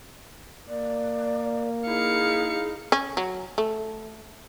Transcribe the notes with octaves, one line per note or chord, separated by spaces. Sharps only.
A#3 D5
D#4 E4 G#4 F5 C#7
C#4
F#3
A3